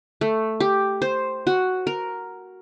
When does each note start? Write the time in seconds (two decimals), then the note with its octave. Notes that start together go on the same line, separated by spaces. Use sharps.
0.21 A3
0.60 G4
1.02 C5
1.47 F#4
1.87 A#4